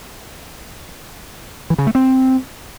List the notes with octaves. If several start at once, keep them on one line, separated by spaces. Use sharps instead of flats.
E3
C#3
A3
C4